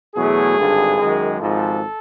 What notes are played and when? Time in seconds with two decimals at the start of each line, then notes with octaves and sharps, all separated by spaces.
0.15 E2 B2 F#3 A3 G#4
0.57 G#1 G2 D3
0.98 F#2 D#3 G#3
1.40 G#1 G#2 F3 G#3 A4